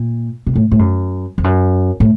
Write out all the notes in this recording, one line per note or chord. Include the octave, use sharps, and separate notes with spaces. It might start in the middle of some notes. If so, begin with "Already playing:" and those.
Already playing: A#2
C3
A2
A2
F#2
F2
F#2
A2